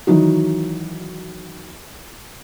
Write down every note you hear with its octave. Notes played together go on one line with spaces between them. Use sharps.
D#3 E3 F#3 D#4 F#4